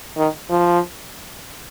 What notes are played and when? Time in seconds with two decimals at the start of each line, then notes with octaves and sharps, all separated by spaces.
0.17 D#3
0.50 F3